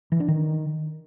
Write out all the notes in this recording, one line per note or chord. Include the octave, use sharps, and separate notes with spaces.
E3
D4
D#3